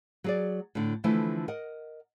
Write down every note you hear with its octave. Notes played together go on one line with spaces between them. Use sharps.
F#3 G#4 D5
A2 D3
D3 E3 F3 A3 E4
A#4 D#5 F#5